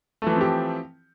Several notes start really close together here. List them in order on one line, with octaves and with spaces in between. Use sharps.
A3 E3 F3 C4 G4